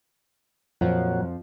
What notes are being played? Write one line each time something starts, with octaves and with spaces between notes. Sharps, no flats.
F2 A#2 F3 F#3